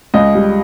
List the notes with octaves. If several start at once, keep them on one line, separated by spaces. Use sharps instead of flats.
C#2 D#5
G3